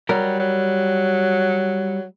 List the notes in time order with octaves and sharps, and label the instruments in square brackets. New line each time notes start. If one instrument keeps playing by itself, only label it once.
[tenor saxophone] F#3 [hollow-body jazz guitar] G3 A#4
[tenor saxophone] F#3